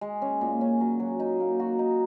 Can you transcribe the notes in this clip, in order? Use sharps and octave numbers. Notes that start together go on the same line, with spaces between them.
G#3
C#4
A#2
C#4
F#3
F#3
D#4
A#3
F#4
D#4